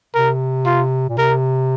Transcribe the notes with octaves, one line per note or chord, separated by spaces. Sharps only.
C3 A#4
F4
A#2
C3 A#4